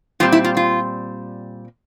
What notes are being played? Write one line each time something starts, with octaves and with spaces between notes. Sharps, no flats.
A#2 G3 C4 F4
E4
F4
F4